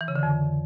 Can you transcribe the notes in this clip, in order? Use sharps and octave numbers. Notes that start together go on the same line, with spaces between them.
E3
C#3
D3
F2